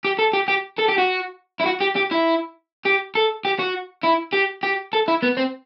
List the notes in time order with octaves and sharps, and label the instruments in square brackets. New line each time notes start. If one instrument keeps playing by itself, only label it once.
[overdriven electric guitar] G4
A4
G4
G4
A4
G4
F#4
E4
F#4
G4
G4
E4
G4
A4
G4
F#4
E4
G4
G4
A4
E4
B3
C4